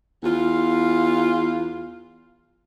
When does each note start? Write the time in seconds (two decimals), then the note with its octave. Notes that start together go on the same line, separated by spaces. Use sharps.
0.23 E2 F4